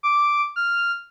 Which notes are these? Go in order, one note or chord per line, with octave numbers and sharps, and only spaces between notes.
D6
F6